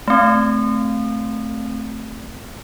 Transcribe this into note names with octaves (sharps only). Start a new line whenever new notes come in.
A3 C4